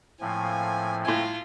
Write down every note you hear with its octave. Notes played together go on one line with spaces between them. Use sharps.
A2 F3 A3 A#3 C4 G#5
A2 F4 G#5